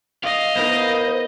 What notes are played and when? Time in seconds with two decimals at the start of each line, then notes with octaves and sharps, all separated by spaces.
0.23 D#5 F5
0.55 B3 E4 A#4 C5